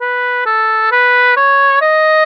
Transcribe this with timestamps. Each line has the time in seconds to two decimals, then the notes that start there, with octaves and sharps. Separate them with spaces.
0.01 B4
0.46 A4
0.92 B4
1.37 C#5
1.82 D#5